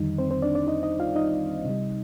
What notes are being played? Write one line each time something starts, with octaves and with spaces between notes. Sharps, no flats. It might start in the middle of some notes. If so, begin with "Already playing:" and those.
Already playing: F2 D3 D#3 G3 D#4
C4 C5
C4 C5
D4 D5
D4 D5
D#4 D#5
D#4 D#5
F4 F5
D#4 D#5
C3 G3